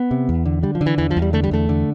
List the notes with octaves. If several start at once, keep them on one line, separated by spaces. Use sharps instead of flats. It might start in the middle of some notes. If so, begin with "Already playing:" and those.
Already playing: B3
C3
E2
D3
D3 G3
F3
D3
E3
E2 E3
F3
E2
G3
D3 A3
G3
E2 A3
D3